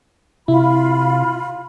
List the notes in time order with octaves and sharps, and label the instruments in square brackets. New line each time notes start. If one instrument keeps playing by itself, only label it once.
[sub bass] C3 [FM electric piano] E4 [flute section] F4 B5